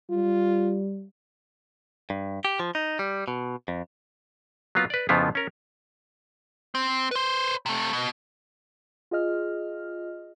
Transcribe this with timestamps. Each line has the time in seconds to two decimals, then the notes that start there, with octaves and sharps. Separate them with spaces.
0.10 G3 F4
2.10 G2
2.45 G4
2.60 F3
2.75 D#4
2.99 G3
3.28 B2
3.68 F2
4.75 F#3 A#3 B3 F4
4.90 B4 D5
5.09 F2 C#3 F3 B3 E4 F4
5.35 C#4 A#4
6.75 C4
7.11 B4 C5
7.66 C3 A3
7.93 B2
9.11 F4 G#4 D#5 F6